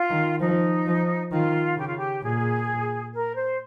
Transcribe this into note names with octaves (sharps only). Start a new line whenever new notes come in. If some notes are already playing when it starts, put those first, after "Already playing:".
Already playing: F4
D#3
F3 D#4
F3
D#3 F4
C#3 G4
F4
G4
A#2 G#4
A#4
C5